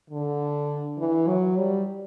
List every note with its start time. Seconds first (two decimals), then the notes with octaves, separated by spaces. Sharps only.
0.10 D3
0.98 E3
1.28 F#3
1.57 G3